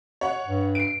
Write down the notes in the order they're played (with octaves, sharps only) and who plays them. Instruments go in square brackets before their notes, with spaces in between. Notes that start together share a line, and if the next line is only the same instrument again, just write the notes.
[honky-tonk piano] C#5 F#5
[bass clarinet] G2
[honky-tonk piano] C7 D7